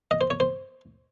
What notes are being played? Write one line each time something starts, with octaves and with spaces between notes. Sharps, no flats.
D#5
C5
C#5
C5